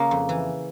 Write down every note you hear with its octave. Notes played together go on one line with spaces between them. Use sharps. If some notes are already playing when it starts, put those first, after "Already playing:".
Already playing: C#3 A#3 C#4
F2
E3